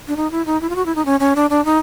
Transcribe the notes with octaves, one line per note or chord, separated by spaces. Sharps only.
D4
D#4
E4
D#4
E4
F4
F#4
E4
D#4
C#4
C#4
D4
D4
D#4